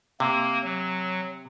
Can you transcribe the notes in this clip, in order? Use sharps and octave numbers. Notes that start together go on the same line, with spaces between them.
C3 A#3
F#3